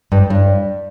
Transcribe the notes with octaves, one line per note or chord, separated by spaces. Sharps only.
G2
G2